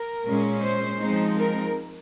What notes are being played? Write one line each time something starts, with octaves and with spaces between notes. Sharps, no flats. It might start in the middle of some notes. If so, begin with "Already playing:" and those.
Already playing: A#4
A#2 G#3 C#4
C5
F3 G#3 C4 D#4
A#4